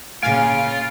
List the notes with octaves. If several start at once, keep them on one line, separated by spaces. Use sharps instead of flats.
A#2 C#3 F4 F5 G#5 D7